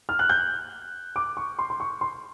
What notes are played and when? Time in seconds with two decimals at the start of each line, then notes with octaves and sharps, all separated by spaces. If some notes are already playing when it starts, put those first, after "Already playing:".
0.09 F6
0.19 F#6
0.29 G6
1.16 D6
1.37 C#6
1.59 C6
1.70 C6
1.80 C#6
2.01 C6